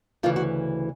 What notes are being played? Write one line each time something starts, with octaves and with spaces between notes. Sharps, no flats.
D2 C#3 E3 F4
F#4